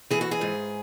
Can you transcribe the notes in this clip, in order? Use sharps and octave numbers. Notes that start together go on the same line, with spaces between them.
E3 G#4
F#4
G#4
G#2